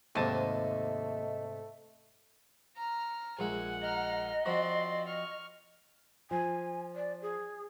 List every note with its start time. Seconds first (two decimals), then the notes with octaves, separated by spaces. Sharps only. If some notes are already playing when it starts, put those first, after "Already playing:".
0.15 D#2 G#2 C3 A3 D#5 A5
2.77 A#5 F6
3.39 A#1 G#3 E5 F#5 G#5
3.82 D#5 A#5 F6
4.46 F3 C4 F#4 D5 C6
5.07 C#6 F6
6.31 F3 G#5
6.96 D5
7.22 G#4